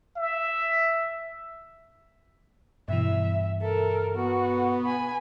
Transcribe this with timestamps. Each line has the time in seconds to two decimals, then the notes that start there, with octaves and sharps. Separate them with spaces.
0.17 E5
2.88 G2 B2 E3 E5
3.62 A4 A#4
4.16 B3 F#4
4.85 G#5 B5